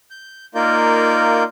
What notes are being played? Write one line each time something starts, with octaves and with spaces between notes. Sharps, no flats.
G6
A#3 D#4 F4 A#4 D5 G6